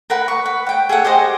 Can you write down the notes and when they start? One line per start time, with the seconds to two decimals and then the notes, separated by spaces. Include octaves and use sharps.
0.10 A#4 B4 F#5
0.28 C#6
0.46 B4
0.66 F#5 G5
0.89 G#4 A4 C#5 F#5
1.04 G4 G#4 C5 D#5